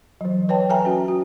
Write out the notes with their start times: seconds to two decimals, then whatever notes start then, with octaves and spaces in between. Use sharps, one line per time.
0.21 E3 F#3
0.49 B4 C#5 G5 A5
0.70 A4 E5 G5 G#5 A#5
0.85 C#4 F#4
1.08 F#4